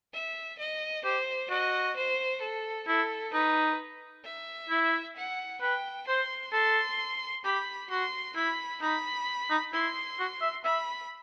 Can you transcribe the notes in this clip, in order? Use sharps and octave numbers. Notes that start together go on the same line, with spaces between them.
E5
D#5
G4 C5
F#4 D#5
C5
A4
E4 A4
D#4 B4
E5
E4
F#5
B4 G5
C5 C6
A4 C6
G4 B5
F#4 C6
E4 B5
D#4 B5
D#4
E4 C6
F#4
E5
E5 B5